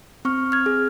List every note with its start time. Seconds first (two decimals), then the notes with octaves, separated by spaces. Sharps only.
0.25 C4 C#6 F6
0.52 F6 G#6
0.66 G#4